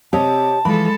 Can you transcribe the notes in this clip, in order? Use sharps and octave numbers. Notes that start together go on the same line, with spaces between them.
C3 G4 C#5 D#5 A5
E3 F3 G#3 A4 B5